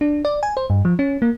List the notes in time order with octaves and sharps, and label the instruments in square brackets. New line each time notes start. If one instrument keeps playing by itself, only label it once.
[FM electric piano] D4
D5
G#5
C5
G2
F3
C#4
A#3